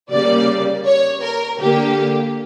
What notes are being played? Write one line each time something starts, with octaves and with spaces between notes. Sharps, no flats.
C#3 G3 A#3 D5
C#5
A#4
D3 A#3 G4